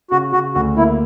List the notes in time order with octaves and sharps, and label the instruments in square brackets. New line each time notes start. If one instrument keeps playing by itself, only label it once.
[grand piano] C#3 [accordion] F#4
[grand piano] C#3 [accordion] F#4
[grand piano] D2 [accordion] F#4
[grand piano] A#3 [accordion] E4